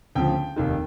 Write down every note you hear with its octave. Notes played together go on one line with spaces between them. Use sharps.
D2 C#3 F3 G5
F1 D#2 D#3